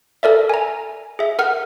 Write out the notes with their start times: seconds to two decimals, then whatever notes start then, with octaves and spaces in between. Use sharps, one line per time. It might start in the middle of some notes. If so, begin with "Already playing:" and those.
0.23 A4 A#4 D5 E5
0.49 G#5 A#5
1.19 G#4 E5
1.39 A#4 F#5 F6